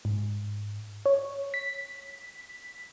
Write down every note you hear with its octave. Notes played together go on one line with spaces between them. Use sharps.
G#2
C#5
B6